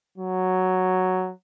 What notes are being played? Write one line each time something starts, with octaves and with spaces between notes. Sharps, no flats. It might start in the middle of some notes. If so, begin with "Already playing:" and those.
F#3